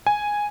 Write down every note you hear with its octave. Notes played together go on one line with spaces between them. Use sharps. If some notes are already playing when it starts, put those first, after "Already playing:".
G#5